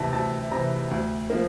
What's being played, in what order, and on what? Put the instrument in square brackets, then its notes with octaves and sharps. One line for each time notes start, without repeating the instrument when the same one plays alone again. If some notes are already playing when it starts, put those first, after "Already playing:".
Already playing: [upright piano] D2 C3 E3 A5
D2 A5
C3 E3 A#5
D2
F3 A#3